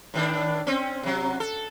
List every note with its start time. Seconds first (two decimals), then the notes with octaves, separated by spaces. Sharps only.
0.14 A2 D#3 D4
0.67 C4 C#4
1.03 C3 F#3
1.40 A4